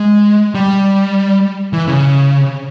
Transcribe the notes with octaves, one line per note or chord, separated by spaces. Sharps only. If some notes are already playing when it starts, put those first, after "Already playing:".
Already playing: G#3
G3
E3
C#3